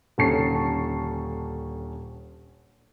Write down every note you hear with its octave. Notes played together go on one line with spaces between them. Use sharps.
D#1 D3 C#4 A5 C#6 C7